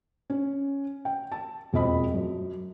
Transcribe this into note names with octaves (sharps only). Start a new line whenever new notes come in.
C#4
G5
A5
E1 F2 C4 D#5 B5
F#2